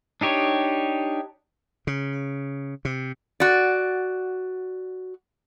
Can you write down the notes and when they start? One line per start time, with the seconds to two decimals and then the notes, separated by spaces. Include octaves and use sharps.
0.21 D4 D#4 G4 C#5
1.87 C#3
2.85 C3
3.40 F#4 D5